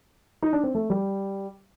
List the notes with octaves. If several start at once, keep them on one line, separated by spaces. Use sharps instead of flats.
D#4
D4
C4
A3
G3